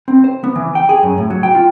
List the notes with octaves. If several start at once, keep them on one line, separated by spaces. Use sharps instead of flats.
C4
C5
B3
E3
G5
G#4
F#2
A2
F#3
G5
F4